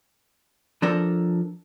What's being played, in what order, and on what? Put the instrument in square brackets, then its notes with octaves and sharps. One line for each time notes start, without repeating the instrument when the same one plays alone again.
[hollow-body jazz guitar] F3 D4 A4 A#4